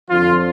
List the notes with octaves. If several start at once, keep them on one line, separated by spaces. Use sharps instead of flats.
F2 D3 F3 F4